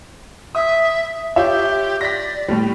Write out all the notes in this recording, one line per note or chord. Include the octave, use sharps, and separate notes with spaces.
E5 D#6
F4 G4 C#5 E5
D5 A#6 B6
A2 G3